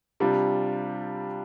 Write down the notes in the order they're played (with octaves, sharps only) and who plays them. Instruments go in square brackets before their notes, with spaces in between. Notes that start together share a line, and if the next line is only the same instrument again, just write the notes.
[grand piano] C3 G3 D4 F4